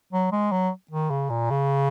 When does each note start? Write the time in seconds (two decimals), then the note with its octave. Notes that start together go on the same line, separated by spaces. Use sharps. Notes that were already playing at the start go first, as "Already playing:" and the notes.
0.13 F#3
0.32 G#3
0.52 F#3
0.91 D#3
1.10 C#3
1.30 A#2
1.50 C#3